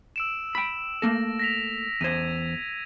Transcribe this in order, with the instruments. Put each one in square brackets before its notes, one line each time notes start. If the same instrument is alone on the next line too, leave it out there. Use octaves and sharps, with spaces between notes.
[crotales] E6 D7 E7
[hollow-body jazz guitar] G5 B5 [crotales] E6
[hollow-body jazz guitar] A3 A#3 A4 [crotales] A#6
[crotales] A#6 B6 F7
[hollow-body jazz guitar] E2 C5 [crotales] G#6 A#6 D#7